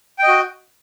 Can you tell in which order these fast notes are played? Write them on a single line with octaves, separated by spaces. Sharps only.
G5 D#5 F#4